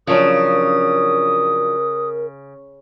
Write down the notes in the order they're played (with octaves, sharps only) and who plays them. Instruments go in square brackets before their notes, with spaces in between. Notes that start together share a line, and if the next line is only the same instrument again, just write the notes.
[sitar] C#3 [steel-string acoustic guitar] F3 F#3 D4 [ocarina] A#4 [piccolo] D#6